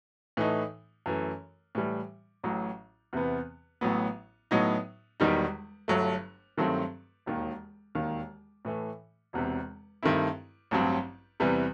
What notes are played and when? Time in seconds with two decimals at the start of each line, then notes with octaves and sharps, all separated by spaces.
0.37 A2 E3 A3 D#4
1.06 F#2 E3 A3
1.75 A2 E3 G3
2.44 A1 A2 F#3
3.13 E2 C3 E3 B3
3.81 A1 A2 F#3 B3
4.51 A2 F#3 B3 D#4
5.20 E1 E2 D#3 G3 D#4
5.88 G1 G2 F#3 A3
6.58 G2 D#3 F#3 A3 C4
7.26 E1 D#2 D#3
7.95 E1 D#2 D#3
8.65 A2 E3 A3
9.33 E1 E2 C3
10.03 G2 D#3 A3 C4 E4
10.71 A1 G2 F#3 C4
11.40 E2 C3 E3 G3